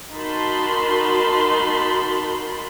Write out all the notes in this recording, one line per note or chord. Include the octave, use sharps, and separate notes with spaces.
D#4 F#4 A#4 A5 B5 C6